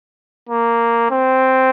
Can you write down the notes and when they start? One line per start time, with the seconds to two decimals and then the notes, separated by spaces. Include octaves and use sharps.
0.49 A#3
1.11 C4